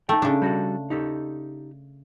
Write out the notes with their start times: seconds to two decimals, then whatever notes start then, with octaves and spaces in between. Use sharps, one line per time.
0.09 A3 D#4 G5
0.22 C#3 D4
0.42 G3 F#4 A4
0.90 D#4 G4 A4